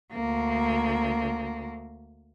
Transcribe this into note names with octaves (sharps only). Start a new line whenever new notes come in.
D2 A#3